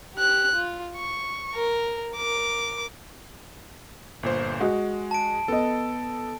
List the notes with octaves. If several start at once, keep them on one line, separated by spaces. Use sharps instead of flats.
G4 F#6
F4
C#6
A#4
A#4 D6
G1 A#2 C5
G#3 F#4 G#4 D#5
A5 D7
B3 A4 D#5